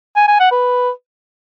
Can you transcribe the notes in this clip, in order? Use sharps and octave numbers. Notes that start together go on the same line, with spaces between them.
G#5
G#5
F#5
B4